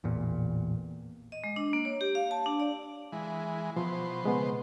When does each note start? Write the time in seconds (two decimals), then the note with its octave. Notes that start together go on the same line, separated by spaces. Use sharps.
0.04 A1 E2 A#2
1.32 D#5
1.44 G#3
1.56 D4
1.73 A#3
1.85 C#5
2.01 G4
2.15 F5
2.31 A5
2.46 D4
2.60 D5
3.12 E3 G#3
3.76 B2 F3 C5
4.23 C#3 G#3 B3